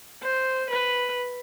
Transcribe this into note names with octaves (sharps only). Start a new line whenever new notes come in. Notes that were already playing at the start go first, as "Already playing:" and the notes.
C5
B4